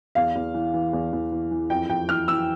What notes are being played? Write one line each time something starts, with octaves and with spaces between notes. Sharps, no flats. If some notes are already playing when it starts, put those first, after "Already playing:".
E2 F5
E2
E3
E3
E2
E2
E3
E3
F2 G5
F2 G5
E3 F6
E3 E6